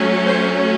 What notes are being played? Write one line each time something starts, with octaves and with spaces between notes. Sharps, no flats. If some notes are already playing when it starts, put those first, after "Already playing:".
Already playing: F#3 A3 C#4
C5